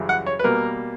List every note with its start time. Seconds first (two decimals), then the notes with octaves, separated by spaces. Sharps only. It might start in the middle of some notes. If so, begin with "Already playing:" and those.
Already playing: F#2 C#3 E3 G3
0.09 F#5
0.26 C#5
0.39 B4
0.44 B2 G3 A#3 A#4